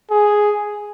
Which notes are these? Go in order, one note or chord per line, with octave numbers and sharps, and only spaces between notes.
G#4